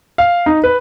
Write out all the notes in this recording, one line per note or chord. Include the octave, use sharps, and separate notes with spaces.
F5
D#4
B4